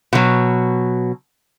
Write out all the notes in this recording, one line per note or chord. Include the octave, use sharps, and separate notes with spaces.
B2 F#3